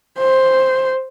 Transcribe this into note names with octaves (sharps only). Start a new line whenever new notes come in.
C5